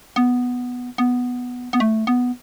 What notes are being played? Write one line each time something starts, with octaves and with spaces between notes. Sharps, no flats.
B3
B3
B3
A3
B3